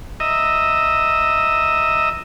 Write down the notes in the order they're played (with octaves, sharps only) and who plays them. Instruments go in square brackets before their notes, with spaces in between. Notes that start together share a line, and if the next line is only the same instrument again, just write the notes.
[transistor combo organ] D#5 E5 A#5